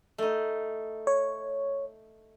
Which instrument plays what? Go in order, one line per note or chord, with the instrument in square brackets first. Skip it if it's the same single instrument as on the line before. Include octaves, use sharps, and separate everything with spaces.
[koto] A3 D#4
[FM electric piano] C#5